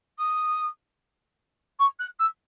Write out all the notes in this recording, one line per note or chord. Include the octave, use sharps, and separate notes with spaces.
D#6
C#6
F#6
E6